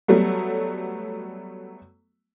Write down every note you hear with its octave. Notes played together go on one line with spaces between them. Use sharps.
F#3 G3 A3 B3